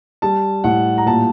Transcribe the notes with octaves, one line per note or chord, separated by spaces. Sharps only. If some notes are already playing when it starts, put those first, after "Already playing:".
G3 A5
A2 F#5
A#5
A#2 A5